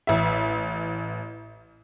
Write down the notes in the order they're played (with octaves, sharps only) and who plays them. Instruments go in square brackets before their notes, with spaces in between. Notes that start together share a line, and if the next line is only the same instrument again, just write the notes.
[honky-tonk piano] A1 E5